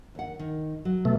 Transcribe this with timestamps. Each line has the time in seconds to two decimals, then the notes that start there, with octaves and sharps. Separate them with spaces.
0.15 D#2 F#5
0.39 D#3
0.85 F#3
1.05 B2 A3